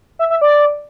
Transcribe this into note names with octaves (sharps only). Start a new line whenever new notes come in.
E5
E5
D5